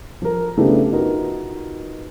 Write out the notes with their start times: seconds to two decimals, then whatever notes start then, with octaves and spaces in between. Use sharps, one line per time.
0.22 F3 A#4
0.57 C#3 A3 B3 D4 E4 G4
0.93 D#4 F4 F#4 A#4 B4